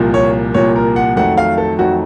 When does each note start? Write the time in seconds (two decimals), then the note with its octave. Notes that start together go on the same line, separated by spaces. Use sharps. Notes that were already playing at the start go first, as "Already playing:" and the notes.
Already playing: C2 A#2 F3 A#3
0.14 C#5
0.54 C2 A#2 F3 A#3 C#5
0.76 A#4
0.96 F#5
1.16 F2 D#3 F#3 A3 F#5
1.38 F5
1.58 A4
1.79 F2 D#3 F#3 A3 F#4